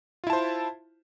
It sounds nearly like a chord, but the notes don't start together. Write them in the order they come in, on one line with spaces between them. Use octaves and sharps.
F4 E4 A5 C5